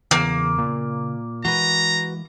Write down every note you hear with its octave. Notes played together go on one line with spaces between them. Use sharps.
E2 C#3 A#3
A#2
E3 G#3 F#4 B4 A#5